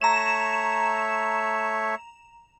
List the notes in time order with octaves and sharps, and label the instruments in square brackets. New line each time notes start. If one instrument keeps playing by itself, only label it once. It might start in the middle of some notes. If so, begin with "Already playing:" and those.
[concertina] A3 C#5 E5 [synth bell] A#5 E7